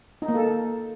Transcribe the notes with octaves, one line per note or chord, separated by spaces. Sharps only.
D#4
A#3
A4